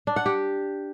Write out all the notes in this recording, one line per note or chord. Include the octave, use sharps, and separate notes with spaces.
D4
F#5
G4